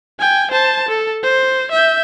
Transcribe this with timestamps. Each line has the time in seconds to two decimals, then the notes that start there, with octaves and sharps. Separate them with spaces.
0.19 G5 G#5
0.51 C5 A5
0.89 A4
1.23 C5
1.72 E5 G6